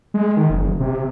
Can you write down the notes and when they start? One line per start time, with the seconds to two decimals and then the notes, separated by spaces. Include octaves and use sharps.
0.14 G#3
0.37 D#3
0.50 F#1
0.80 C3